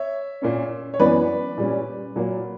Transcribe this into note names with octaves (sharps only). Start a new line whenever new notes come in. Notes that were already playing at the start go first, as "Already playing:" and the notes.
Already playing: C#5 E5
A#2 A#3 C#4
C#5
F#2 E3 B3 B4 D5
A#2 G3 C#4
A#2 F#3 A#3